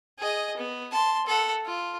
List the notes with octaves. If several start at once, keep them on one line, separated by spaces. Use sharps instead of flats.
G#4 D#5
B3
A5 C6
A4 F#5
F4